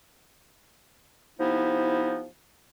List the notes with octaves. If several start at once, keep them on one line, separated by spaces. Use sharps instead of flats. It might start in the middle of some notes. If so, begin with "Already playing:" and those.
C3 F3 B3 D#4 E4